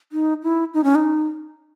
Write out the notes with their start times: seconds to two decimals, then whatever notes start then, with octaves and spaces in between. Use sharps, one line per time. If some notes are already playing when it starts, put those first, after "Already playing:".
0.12 D#4
0.43 E4
0.74 D#4
0.84 C#4
0.95 D#4